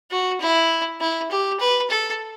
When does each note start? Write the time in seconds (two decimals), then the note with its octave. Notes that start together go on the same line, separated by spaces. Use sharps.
0.11 F#4
0.41 E4
1.00 E4
1.31 G4
1.60 B4
1.90 A4